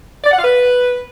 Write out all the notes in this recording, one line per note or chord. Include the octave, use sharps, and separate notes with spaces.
D5
F#5
F5
B4